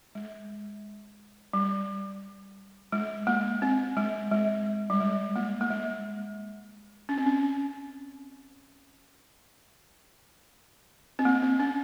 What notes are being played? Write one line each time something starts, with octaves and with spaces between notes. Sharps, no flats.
G#3
G3
G#3
A#3
C4
G#3
G#3
G3
G#3
A#3
A#3
G#3
C#4
C4
C#4
C4
A#3
C4
C#4